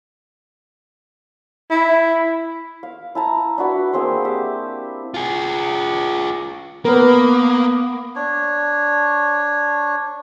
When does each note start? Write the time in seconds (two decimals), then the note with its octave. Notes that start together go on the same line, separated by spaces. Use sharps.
1.70 E4
2.83 F5
3.15 E4 A5 A#5
3.58 D4 E4 F#4 B4
3.93 A#3 C4 G#4 C5
4.25 G4 E5
5.14 F4 G#4
6.85 A#3 B3 A#4 B4
8.16 D4 C#5